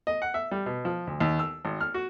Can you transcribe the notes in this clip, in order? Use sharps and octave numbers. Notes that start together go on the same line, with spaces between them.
D#5
F#5
E5
G3
B2
F3
D2
D#2
E6
G#1
F6
F#4